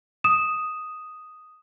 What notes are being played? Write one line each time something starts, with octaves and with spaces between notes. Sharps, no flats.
D#6 E7